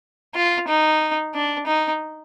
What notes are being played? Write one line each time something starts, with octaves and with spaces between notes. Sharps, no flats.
F4
D#4
D4
D#4